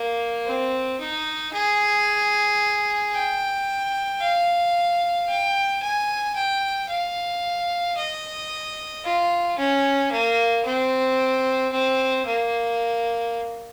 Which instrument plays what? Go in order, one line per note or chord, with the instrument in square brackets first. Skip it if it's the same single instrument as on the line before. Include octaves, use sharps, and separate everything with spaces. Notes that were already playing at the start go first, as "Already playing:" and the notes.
Already playing: [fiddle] A#3
C4
D#4
G#4
G5
F5
G5
G#5
G5
F5
D#5
F4
C#4
A#3
C4
C4
A#3